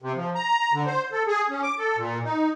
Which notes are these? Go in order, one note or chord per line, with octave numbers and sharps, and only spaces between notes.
C3
F3
A#5
D3
C5
A4
G#4
C#4
D6
A4
A#2
D#4